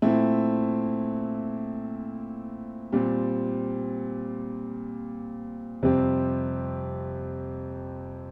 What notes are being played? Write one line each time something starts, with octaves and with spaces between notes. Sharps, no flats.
A#2 A3 C4 E4
A#2 G3 C4
F2 C3 G3 C4